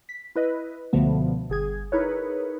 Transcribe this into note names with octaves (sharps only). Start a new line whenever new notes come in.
B6
E4 B4 D#5
C#2 B2 D3 F3 A3 B3
G1 G#4 G#6
D#4 E4 G#4 A#4 B4 C#5